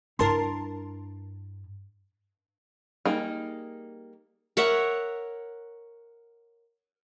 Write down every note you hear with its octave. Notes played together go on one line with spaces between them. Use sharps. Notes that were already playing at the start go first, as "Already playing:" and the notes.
G2 E4 A#4 A5 C6
G3 A#3 D#4 G#4
A#4 C#5 E5 F#5